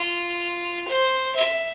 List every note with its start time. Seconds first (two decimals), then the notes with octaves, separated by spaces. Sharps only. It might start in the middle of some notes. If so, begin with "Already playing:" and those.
Already playing: F4
0.88 C5
1.36 E5